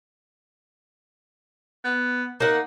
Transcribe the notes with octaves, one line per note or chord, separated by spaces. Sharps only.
B3
A#3 D#4 F#5